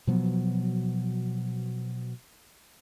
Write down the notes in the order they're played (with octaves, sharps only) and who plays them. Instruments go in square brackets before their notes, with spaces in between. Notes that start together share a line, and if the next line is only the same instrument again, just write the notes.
[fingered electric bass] B2 F3 F#3 B3